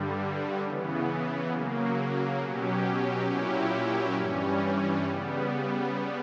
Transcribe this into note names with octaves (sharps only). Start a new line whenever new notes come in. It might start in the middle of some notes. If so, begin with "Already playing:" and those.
Already playing: G2 D3 G3
C#3 E3 B3
C#3 F#3 A#3
B2 F#3 C#4 G4
A#2 F#3 C#4 E4 G4
G2 E3 G3 C#4
C#3 G3 B3